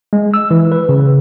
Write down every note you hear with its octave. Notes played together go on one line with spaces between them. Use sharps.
G#3
E6
E3
B4
C#3